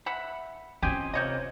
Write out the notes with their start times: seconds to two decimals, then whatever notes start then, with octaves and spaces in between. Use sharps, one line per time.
0.06 E5 F#5 B5
0.83 C4 C#4 F4 G4 D#5 G#5
1.14 C3 A#3 C5 C#5 D#5